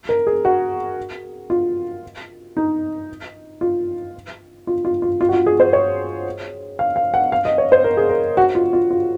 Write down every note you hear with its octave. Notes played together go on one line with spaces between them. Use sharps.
A#4
G#4
F#4
F4
D#4
F4
F4
F4
F4
F4
F#4
F4
G#4
C5
C#5
F5
F5
F#5
F5
D#5
C#5
C5
A#4
G#4
A#4
F#4
F4
F4
F4